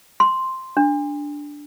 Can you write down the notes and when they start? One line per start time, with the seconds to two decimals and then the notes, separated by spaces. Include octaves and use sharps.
0.20 C6
0.77 D4